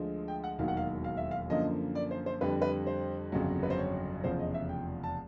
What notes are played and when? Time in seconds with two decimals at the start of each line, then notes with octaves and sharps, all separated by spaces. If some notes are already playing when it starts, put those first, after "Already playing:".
Already playing: D2 D3 F3 G#3
0.28 G5
0.44 F#5
0.58 E1 D#2 D#3 F#3 F5
0.68 F#5
0.77 F5
1.04 F5
1.17 E5
1.31 F5
1.50 F#2 D3 F3 A#3 D#5
1.95 D5
2.11 C5
2.26 C5
2.41 F2 D3 G3 B4
2.62 B4
2.87 C5
3.32 G1 F2 C#3 F#3
3.63 B4
3.70 C5
3.78 C#5
4.24 F1 E2 C#3 F3 C5
4.39 D#5
4.54 E5
4.69 G5
5.04 A5